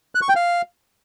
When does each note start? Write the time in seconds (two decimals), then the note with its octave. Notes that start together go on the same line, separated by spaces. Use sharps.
0.15 F#6
0.22 C#6
0.29 G5
0.36 F5